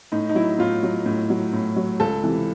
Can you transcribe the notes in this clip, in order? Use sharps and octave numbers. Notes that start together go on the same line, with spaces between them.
A2 D#4
D#4
F#3 E4
A2 F4
F#3
A2
F#3
A2
F#3
C#2 A4
C3 E3